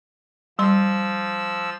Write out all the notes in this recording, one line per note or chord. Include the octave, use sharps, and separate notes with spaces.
F3 G3 C6 E6